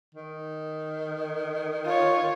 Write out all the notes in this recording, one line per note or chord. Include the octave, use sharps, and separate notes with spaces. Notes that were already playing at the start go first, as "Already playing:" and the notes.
D#3
F4 C#5